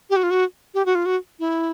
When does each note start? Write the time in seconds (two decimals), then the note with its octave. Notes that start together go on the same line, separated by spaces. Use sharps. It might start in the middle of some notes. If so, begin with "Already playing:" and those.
0.10 G4
0.16 F#4
0.23 F4
0.30 F#4
0.74 G4
0.86 F#4
0.95 F4
1.06 F#4
1.39 E4